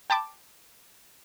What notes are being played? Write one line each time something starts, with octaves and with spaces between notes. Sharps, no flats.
G5 A5 B5 D6